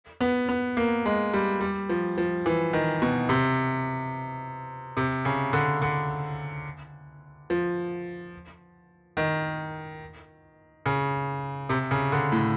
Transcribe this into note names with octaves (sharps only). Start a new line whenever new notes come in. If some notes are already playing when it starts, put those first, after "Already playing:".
B3
B3
A#3
G#3
G3
G3
F3
F3
E3
D#3
B2
C3
C3
C#3
D3
D3
F3
D#3
C#3
C3
C#3
D3
A2